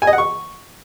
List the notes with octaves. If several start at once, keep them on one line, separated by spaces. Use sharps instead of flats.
G#5
D#5
F#5
C#6